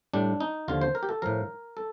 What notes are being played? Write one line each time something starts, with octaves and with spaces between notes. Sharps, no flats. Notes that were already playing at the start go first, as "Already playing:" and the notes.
A2 G3 D4
D#4
D#2 D3 F3 F4
C5
A#4
G4
A4
A2 F3 A#4
A4